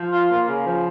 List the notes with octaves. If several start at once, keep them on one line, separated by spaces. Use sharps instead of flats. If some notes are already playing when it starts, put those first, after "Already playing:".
Already playing: F3
F4
A#3
C#3
F3